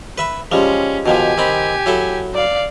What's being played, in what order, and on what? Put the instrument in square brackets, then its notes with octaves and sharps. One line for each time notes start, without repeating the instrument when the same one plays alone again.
[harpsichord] B4 E5 B5
[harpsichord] F3 G3 G#3 [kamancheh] C#4
[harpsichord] B2 D#3 F3 [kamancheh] G4 G#5
[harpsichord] D#3 C4 B5
F#3 E4 A4
[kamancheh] D5 F5